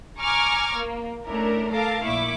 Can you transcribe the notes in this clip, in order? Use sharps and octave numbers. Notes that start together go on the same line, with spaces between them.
G#5 A#5 C#6 D6 F6 G#6
A#3
A3 C#4 D4 E4 A#4
A4 A#4 F5 A5 D6
A#1 A#2 E4 C#6 D6